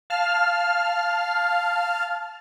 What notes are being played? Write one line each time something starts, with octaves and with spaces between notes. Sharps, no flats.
F5 A5 F6